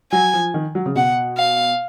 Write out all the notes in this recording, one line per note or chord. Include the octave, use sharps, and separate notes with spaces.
F#3 G#5
F3
D#3
F#3
C#3
B2 F#5
F5